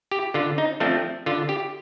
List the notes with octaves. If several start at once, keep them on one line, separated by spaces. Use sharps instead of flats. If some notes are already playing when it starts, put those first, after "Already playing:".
G4
D3 F4
D#4
F3 A3 C4 D4
D3 F4
G4